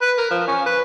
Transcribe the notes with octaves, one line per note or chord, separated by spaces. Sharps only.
B4
A#4
F3
C#4
B4